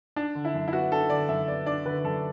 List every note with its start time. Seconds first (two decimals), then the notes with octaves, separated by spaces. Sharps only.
0.16 D4
0.35 D3
0.45 E4
0.54 F#2
0.68 E4
0.73 B3 F#4
0.92 D4 A4
1.10 D3 D5
1.29 F#2 E5
1.48 B3 D5
1.66 D4 D5
1.85 D3 B4
2.04 F#2 A4